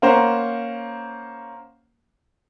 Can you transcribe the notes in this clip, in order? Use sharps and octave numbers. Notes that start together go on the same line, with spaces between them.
A#3 C#4 C5 F#5 A#5